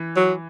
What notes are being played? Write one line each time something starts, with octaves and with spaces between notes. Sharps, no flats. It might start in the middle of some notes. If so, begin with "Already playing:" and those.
Already playing: E3
F#3